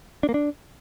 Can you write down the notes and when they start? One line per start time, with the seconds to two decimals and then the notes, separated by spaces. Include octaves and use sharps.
0.23 D4
0.29 A#3
0.34 D4